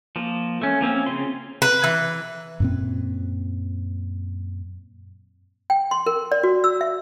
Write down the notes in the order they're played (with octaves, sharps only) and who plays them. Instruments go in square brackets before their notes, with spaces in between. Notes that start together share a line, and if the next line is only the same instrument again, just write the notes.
[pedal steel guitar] F3 A#3
A3 C#4
F3 A#3 C4 C#4
C#3 C4 F4 C6
[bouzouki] B4
E3
[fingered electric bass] F#2 A#2 C4
[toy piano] G5
C6
A#4
D5
F#4
E6
E5